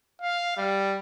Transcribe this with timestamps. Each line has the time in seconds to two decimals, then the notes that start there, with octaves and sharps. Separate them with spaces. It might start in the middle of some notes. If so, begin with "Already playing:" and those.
0.22 F5
0.57 G3